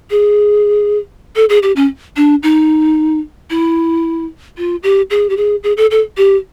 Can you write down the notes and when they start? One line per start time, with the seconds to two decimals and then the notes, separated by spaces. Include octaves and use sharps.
0.11 G#4
1.36 A4
1.49 G#4
1.63 G4
1.76 C#4
2.17 D4
2.43 D#4
3.50 E4
4.58 F4
4.83 G4
5.10 G#4
5.30 G4
5.37 G#4
5.64 G#4
5.77 A4
5.91 A4
6.17 G4